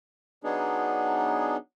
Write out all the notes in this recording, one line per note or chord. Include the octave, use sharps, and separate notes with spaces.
F#3 B3 D4 D#4 G#4